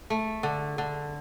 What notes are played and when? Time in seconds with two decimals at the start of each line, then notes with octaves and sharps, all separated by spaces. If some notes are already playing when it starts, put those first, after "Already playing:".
0.10 A3
0.43 D3
0.78 D3